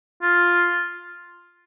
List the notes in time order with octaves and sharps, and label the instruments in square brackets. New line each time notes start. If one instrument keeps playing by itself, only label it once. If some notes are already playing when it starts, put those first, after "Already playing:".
[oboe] F4